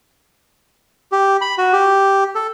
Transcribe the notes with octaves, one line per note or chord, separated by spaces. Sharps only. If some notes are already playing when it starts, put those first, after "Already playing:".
G4
B5
F#4
G4
A4